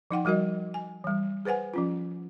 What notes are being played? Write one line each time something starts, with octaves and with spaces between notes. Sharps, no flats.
F3 D#4 F#5 G5
F3 G3 F#4 A#4 D#5
G#5
E3 G3
G#4 B4 C5 F#5 G#5
F3 C#4 F4